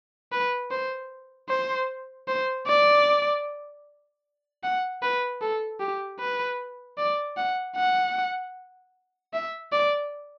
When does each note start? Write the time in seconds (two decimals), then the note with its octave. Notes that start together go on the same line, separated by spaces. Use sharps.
0.32 B4
0.71 C5
1.49 C5
2.28 C5
2.67 D5
4.63 F#5
5.02 B4
5.41 A4
5.80 G4
6.20 B4
6.98 D5
7.37 F#5
7.76 F#5
9.33 E5
9.72 D5